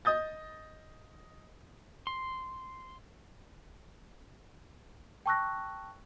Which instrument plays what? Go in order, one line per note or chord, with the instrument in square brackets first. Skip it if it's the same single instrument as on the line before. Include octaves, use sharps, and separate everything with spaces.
[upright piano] D#5 D#6 G6 A6
[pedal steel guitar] C6
[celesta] G5 A5 C#6 E6 F#6 A#6